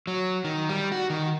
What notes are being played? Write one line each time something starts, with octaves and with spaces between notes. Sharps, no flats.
F#3
D#3
G3
F#4
D#3